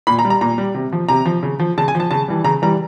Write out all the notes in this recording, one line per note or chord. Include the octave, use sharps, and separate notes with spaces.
A#2 B5
A#5
G3
A#5
A#2 A#5
G3
C3
F3
C3 A#5
F3
C#3
F3
C#3 A5
G#5
F3
A5
C#3 A5
E3 G3
C#3 A#5
E3 G3 A#5